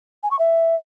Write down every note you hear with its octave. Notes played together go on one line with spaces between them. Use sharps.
G#5
C#6
E5